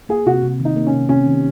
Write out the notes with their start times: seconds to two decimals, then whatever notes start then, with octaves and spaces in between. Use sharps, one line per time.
0.09 A#3 G#4
0.26 C3 F#4
0.43 C3
0.60 D#3
0.65 D#4
0.76 A#3
0.87 C#4
0.93 C3
1.09 C3 C#4
1.26 D#3